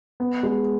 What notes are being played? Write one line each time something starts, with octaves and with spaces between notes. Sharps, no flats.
B3
G#3